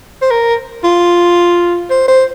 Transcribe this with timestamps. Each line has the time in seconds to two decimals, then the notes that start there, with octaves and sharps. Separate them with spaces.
0.22 C5
0.31 A#4
0.84 F4
1.90 C5
2.08 C5